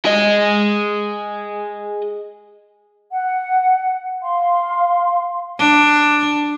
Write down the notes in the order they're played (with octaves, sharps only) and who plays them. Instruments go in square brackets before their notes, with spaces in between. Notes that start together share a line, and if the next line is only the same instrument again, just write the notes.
[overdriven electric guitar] G#4 D#5
[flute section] F#5
F5 C6
[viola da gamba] D4